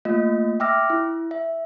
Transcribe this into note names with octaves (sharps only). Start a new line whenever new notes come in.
A3 A#3 F4 D#5
E5 G5 D6 E6 F6 A#6
E4
E5